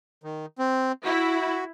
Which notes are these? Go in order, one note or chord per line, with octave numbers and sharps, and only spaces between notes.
D#3
C4
E4 F#4